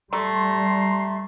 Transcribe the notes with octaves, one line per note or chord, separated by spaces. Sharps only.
G3 A3 A#5 C6